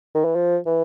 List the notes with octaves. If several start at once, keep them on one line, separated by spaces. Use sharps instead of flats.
D#3
E3
F3
E3